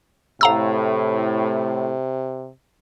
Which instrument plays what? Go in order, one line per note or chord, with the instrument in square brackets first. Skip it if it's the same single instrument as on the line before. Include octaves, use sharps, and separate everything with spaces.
[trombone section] A2 [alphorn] C3 [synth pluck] F5 A#5 E6